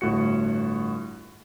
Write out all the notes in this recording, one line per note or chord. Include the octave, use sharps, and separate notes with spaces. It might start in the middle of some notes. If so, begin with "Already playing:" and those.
G1 A2 F4 F#4 C#7